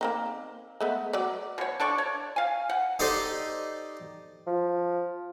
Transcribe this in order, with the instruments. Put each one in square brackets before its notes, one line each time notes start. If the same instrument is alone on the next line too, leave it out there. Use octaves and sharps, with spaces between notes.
[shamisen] A#3 C4 D#4
G#3 A3 B3
F#3 D5
[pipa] B2 C#5
D4 A4 D5 C#6
C#5
F5 G#5
F#5
[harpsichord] D#4 G4 A4 C5 D5
[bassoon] F3